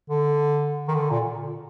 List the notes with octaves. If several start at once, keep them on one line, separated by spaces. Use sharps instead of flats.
D3
D#3
D3
A#2